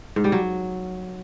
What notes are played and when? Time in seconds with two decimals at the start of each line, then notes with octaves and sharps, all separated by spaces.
0.16 G#2
0.24 G3
0.32 F#3